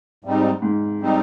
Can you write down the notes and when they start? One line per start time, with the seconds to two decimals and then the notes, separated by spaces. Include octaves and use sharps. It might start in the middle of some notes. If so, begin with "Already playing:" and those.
0.24 G#2 G3 C4 D#4
0.62 G#2
1.01 G3 C4 D#4